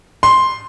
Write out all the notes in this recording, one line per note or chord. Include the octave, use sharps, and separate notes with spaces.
C6